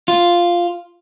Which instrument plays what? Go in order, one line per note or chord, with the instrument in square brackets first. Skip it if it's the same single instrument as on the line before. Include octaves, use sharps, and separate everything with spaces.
[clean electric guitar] F4